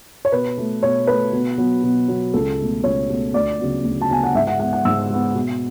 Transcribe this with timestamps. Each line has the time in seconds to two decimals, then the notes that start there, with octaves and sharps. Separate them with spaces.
0.25 C#5
0.32 B2 B4
0.58 A3
0.83 B2 C#5
1.07 A3 B4
1.33 B2
1.58 F#3 B3
1.83 B2
2.08 F#3 B3
2.34 C#2 A4
2.59 B2 A3
2.84 C#2 C#5
3.09 B2 A3
3.34 D2 D5
3.59 C#3 F#3 B3
3.84 D2
4.02 A5
4.10 C#3 F#3 B3 G#5
4.24 F#5
4.35 G#2 E5
4.47 F#5
4.60 G#3 B3 F#5
4.73 F#5
4.85 G#2 E6
5.10 G#3 B3
5.35 B2